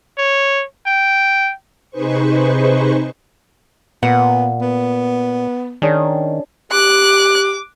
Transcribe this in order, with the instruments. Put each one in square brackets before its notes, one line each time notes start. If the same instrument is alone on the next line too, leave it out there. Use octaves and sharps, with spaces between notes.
[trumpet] C#5
G5
[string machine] C3 D#4 G#4 B4 C5 C#6
[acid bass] A#2 [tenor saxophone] B3 [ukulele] F#5
[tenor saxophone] B3
[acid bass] D#3 [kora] C#4 D4 G#4
[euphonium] G4 [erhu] D6 [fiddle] F#6